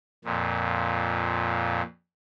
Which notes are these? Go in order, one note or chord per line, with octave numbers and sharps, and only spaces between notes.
F2 A#2